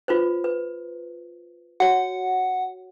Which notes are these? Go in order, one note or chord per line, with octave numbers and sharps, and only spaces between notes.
F4 B4 C5
B4
F#4 C#5 F#5